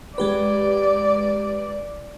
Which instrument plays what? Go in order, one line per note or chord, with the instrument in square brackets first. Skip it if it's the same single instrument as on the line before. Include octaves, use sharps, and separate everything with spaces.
[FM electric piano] G#3 G4 B4 [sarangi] D5